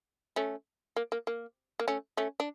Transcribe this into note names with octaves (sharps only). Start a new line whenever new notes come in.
A3 C#4
A#3
A#3
A#3
A#3
A3 C#4
A3 C#4
D4